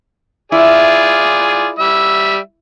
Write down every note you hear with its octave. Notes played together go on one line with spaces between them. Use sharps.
E4 F4 G#4 D5
G3 E5